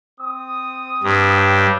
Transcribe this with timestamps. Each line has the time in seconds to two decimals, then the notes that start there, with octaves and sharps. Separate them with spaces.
0.21 C4 D#6
1.03 G2
1.36 D4 C#5 G5